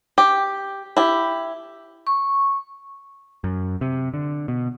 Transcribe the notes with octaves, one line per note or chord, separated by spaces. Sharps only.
G4
E4 G4
C#6
F#2
C3
D3
B2